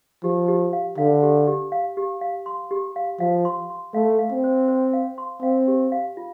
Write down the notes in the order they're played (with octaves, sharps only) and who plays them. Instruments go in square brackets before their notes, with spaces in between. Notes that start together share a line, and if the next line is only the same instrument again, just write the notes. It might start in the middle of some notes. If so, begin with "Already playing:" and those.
[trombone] F3 [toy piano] G4
[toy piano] G4
F5
[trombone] D3 [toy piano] F5
[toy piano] G4
G4
F5
G4
F5
C6
G4
F5
[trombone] F3 [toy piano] F5
[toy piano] C6
C6
[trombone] A3 [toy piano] F5
[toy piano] F5
[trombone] C4
[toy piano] C5
C5
F5
C6
[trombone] C4 [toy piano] F5
[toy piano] G4
F5
F4